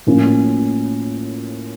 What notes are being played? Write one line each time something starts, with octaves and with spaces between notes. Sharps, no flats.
A2 F3 A#3 C#4 F4